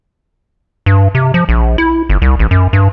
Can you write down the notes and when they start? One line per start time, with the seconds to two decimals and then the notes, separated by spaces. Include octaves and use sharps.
0.86 G2
1.15 C3
1.34 F3
1.49 A#1
1.78 E4
2.10 G1
2.22 C2
2.39 A1
2.51 F#2
2.73 G2